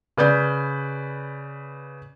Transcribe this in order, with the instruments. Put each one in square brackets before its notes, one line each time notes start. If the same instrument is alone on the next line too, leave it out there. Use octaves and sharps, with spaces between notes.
[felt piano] C#3 B4 D5 G6